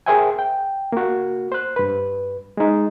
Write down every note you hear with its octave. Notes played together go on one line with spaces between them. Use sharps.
G#4 A#4 C5 E5 G5 G#5
G5
A#3 F#4
C5 F#6
G2 B4
G#3 D#4